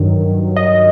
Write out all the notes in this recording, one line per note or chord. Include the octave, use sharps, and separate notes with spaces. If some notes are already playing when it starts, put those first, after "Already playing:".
Already playing: G2 D#3 F#3
D#5